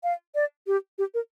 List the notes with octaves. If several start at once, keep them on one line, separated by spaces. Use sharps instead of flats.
F5
D5
G4
G4
A#4